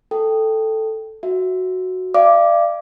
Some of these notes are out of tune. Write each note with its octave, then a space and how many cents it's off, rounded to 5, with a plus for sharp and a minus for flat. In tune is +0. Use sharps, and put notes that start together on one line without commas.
A4 +0 G5 +0
F#4 +0 E5 +0
D5 +20 F5 -40 D6 +0